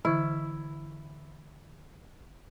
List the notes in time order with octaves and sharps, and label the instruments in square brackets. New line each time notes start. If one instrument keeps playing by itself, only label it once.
[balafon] D3 E3 [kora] E4